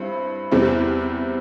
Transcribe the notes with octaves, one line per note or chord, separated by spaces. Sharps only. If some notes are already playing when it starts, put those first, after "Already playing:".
Already playing: G2 C4 E4
E2 C3 G3 C4 E4